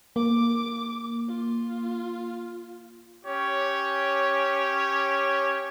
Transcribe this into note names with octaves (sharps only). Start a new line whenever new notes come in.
A#3 D6
F4
C#4 G4 C#5